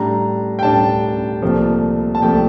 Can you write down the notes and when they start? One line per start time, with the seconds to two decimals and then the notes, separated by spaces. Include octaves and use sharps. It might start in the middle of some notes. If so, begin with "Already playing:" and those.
Already playing: A2 G3 D4 A#5
0.59 G5
0.63 A2 G3 D4 A5
1.42 C2 A#2 F3 A3
2.15 A5
2.22 C2 A#2 F3 A3 G5